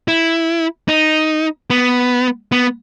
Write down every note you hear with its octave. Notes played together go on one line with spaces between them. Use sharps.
E4
D#4
B3
B3